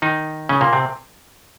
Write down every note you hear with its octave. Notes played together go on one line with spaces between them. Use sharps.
D#3 D#4
C#3 C#4
A#2 A#3
C3 C4